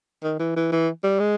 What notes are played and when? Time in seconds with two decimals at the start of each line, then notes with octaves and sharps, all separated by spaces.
0.23 D#3
0.39 E3
0.56 E3
0.72 E3
1.03 G3
1.19 G#3